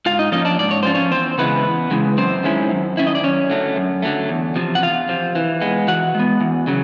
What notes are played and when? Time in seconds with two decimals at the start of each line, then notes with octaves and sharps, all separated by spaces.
0.06 G#2 F4 F5
0.19 D#4 D#5
0.32 F3 A#3 C#4 D#4 F4 D#5
0.45 D4 D5
0.59 G#2 D5
0.71 C#5
0.83 F3 A#3 C#4 F4 C5
0.95 C#4 C#5
1.11 E2 C4 C5
1.38 C#3 E3 G#3 B3 B4
1.65 E2
1.91 C#3 E3 G#3
2.18 F#2 C4 C5
2.43 D#3 G#3 C#4 E4
2.71 F#2
2.97 D#3 G#3 C#4 E4 E5
3.07 D#5
3.15 D5
3.23 F#2 C#4 C#5
3.50 D3 F#3 A3
3.76 F#2
4.02 D3 F#3 A3
4.29 E2
4.56 C3 F3
4.75 F#5
4.83 E2 F4 F5
5.09 C3 F3
5.35 E3
5.61 G#3 B3
5.88 E3 F#4 F#5
6.15 G#3 B3
6.41 E2
6.67 C#3 F#3